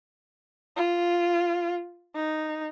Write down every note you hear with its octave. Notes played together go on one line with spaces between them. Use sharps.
F4
D#4